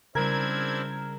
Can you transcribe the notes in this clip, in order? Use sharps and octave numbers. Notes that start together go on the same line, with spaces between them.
C#3 G3 C4 D4 E4 A#4 G#6